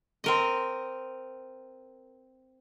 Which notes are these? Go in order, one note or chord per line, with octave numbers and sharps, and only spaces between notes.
C4 A#4 D#5